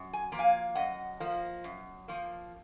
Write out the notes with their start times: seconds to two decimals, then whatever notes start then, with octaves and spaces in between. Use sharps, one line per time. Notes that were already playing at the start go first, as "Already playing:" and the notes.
Already playing: F#2
0.13 G#5
0.32 F3 A#3
0.39 F5 G#5
0.75 F#2 D#5 F#5
1.20 F3 A#3
1.64 F#2
2.08 F3 A#3